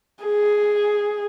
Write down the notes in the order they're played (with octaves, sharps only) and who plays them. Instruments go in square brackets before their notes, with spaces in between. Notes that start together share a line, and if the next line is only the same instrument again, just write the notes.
[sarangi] G#4